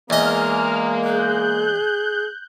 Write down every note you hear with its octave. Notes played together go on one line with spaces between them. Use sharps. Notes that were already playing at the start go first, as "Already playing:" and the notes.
E2 G#3 A#3 D#5 G#5 F6
G#4 F#6 G6